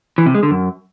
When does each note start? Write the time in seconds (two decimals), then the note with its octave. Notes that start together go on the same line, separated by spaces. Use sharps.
0.18 E3
0.26 C3
0.35 G#3
0.43 D3
0.51 F#2